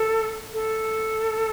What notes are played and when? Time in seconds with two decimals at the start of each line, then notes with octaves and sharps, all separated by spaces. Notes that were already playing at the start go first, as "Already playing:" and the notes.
Already playing: A4
0.53 A4